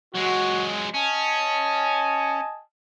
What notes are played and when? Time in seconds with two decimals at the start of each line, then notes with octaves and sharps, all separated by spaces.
0.15 F#3 G#3 F#4
0.94 C#4 D#5 G#5 A5